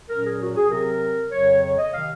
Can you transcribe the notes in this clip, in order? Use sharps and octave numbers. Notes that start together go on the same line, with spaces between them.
A#2 F#3 C#4 A#4
G#4
F#4
G#4
C3 F#3 C4 A#4
F2 C#3 F#3 C#5
C#5
D#5
C3 D#3 F5